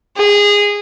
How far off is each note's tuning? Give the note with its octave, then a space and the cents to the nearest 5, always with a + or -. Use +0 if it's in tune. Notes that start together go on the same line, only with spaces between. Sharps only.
G#4 -20